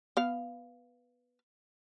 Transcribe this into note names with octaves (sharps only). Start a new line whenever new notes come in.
B3 F5